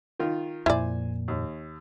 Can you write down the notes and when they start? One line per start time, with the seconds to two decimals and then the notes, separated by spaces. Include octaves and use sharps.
0.20 D#3 F4
0.66 F2 A#2 E4 C5 D5 G#5
1.28 D#2